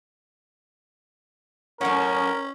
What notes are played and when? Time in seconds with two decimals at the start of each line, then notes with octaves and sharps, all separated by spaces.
1.81 F#2 A2 C#4 A#4 F#5 C#6